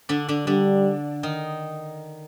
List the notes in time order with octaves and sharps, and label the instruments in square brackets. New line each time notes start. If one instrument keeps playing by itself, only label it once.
[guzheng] D3 D4
D3 D4
[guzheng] D3 D4 [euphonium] G3
[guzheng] D#3 D#4